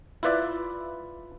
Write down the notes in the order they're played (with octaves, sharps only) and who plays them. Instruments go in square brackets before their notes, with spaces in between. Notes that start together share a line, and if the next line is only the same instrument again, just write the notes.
[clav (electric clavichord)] E4 F4 B4 D5 E5